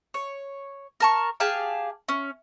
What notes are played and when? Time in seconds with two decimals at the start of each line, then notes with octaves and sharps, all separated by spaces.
0.14 C#5
1.00 A#4 A5 C#6
1.40 G4 G#4 F5 A5
2.09 C#4